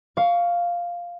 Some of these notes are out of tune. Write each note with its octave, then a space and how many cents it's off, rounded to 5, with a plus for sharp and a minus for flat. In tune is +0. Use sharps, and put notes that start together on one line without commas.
F5 +0 C#6 +25